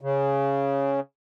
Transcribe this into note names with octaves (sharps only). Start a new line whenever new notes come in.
C#3